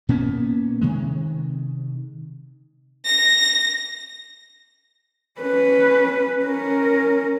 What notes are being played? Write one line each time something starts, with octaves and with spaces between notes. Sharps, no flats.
A#2 A#3 B3 C#4
C3 D#3 G#3
A#6
C#4 B4
C#4 A#4